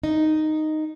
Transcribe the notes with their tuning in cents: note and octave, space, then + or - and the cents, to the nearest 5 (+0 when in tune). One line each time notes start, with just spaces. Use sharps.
D#4 -5